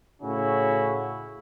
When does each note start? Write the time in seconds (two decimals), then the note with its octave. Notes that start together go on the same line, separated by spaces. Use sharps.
0.22 A2 C#3 C#4 E4 F#4